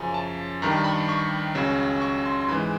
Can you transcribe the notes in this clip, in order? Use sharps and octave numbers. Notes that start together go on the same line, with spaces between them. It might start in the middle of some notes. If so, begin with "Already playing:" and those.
Already playing: F#2 C#3 F3 G#5
A5
G2 D#3 G3 A#5
B5
C#6
C#2 C#3 F#3
C#6
C6
C6
G#2 E3 G#3 B5